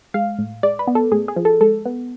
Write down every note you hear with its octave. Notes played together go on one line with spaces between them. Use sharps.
G#3 F5
A2
G#3 D5
B4
B3
A4
A2 G#4
G#4
F3
A4
G#3 A4
B3